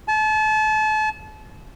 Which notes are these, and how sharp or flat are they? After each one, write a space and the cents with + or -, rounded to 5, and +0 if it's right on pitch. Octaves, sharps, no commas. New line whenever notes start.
A5 -35